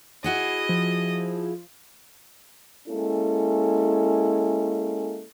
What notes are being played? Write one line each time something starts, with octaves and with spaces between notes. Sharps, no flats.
E4 F#4 G#4 D#5
F3
G#3 A#3 C#4 E4 A4